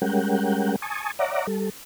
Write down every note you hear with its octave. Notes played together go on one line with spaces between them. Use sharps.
G3 G#3 C#4 A#4 F#5 G5
G#5 A5 C#6 D#6
C#5 D5 E5 F#5 A#5 D6
G3 A4